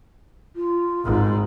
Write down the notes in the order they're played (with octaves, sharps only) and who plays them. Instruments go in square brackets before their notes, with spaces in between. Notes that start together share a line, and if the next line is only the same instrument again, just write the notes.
[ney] F4
[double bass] G#1 G#2